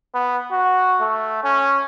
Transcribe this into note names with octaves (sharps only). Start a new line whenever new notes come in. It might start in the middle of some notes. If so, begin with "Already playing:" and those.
B3
F#4
A3
C#4